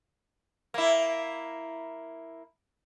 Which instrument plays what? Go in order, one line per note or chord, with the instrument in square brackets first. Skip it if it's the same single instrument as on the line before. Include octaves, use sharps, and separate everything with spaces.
[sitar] A#3 E4